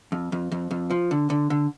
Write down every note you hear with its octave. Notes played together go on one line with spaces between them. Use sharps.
F2
F2
F2
F2
F3
D3
D3
D3